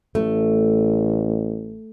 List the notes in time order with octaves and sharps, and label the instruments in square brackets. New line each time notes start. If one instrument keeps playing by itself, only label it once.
[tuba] A1 [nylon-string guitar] A3